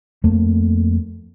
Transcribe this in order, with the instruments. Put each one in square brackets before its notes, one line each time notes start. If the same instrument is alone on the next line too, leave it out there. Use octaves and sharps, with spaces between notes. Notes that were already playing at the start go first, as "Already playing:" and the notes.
[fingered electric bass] F2 A3 A#3